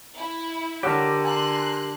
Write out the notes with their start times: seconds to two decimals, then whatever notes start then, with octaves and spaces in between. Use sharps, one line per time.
0.16 E4 E5
0.83 D3 G4 A#4 C#5 F#5 E6
1.24 G#5 A#5 C6 F#6